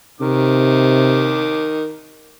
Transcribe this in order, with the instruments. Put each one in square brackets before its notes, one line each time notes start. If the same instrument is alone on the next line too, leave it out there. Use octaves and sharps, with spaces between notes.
[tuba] C3 [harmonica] D#3 D6